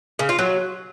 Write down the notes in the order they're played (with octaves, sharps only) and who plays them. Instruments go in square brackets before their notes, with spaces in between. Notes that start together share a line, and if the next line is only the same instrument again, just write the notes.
[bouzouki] C#3
F4
F#3